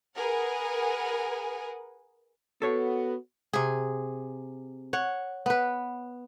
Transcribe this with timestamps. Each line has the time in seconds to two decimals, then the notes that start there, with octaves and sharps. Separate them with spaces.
0.16 G#4 A#4 B4 F#5 G#5
2.62 B3 F#4 A4 C#5
3.53 C3 G#4
4.93 C#5 F#5
5.46 B3 B4